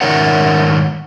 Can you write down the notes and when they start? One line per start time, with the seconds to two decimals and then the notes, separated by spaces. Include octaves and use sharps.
0.01 G#2 D#3 D#4 A#4 C#5 F#5